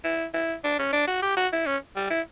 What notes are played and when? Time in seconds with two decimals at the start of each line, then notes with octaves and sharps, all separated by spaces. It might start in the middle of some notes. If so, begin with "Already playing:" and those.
0.04 E4
0.34 E4
0.64 D4
0.79 C#4
0.93 D4
1.07 F#4
1.23 G4
1.37 F#4
1.53 E4
1.66 C#4
1.96 G3
2.10 E4